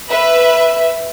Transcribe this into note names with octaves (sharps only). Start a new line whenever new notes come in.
B4 E5